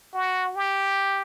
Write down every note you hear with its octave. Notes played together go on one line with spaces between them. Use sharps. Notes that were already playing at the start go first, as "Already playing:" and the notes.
F#4
G4